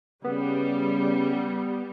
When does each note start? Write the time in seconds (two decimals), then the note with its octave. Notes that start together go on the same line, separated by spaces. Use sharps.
0.24 C#3 G3 B3